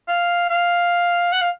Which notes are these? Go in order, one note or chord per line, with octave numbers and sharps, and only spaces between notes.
F5
F5
F#5
F5